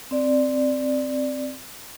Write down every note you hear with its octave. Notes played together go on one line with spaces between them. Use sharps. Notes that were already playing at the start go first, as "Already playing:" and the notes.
C4 D5